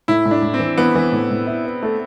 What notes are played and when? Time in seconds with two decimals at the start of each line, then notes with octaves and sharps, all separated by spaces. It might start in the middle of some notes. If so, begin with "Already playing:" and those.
0.08 A2 E4
0.26 A2
0.31 D4
0.42 A2
0.54 C4
0.59 E3
0.78 E3 B3
0.95 E3
1.12 A2
1.31 A2
1.47 E4
1.65 B4
1.83 A3